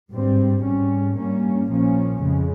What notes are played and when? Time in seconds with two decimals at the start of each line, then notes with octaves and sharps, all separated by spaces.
0.11 G#1 G2 G3 C4
0.63 G#2 G3 C#4
1.16 G2 G3 A#3 C#4
1.68 A#1 A#2 F3 A#3 C#4
2.20 F2 C#3 G#3